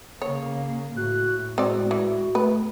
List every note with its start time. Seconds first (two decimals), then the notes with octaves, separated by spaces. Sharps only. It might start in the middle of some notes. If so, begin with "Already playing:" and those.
0.22 C#3 A#3 C#5
0.97 A2 F#4 F#6
1.58 G#3 C4 F#4 D5
1.91 E3
2.35 A3 B4